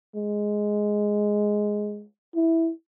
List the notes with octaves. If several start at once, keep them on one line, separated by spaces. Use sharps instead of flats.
G#3
E4